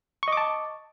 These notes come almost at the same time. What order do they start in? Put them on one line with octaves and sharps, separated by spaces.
C#6 D#5 D6 A5